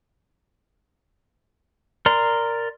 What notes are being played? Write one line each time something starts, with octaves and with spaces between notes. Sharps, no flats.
A#4 D5 A#5 C6